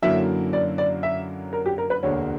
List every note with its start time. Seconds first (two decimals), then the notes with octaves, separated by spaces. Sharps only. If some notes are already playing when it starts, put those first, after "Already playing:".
0.02 F#2 D3 F#3 A#3 E4 E5
0.53 D5
0.78 D5
1.03 E5
1.53 A#4
1.66 G4
1.78 A#4
1.90 B4
2.03 E1 D2 D3 A#3 D4 C#5